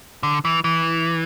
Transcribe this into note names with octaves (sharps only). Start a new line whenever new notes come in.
D3
E3
E3